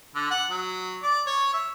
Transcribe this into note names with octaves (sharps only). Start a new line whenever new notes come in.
D3
F#5
F#3
D5
C#5
E5